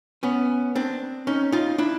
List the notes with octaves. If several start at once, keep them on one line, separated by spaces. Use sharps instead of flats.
B3 C#4
C4 D4
C#4 D#4
D#4 F4
D4 E4